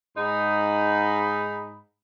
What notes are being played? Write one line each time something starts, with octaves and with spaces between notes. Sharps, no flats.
G#2 D#4 B5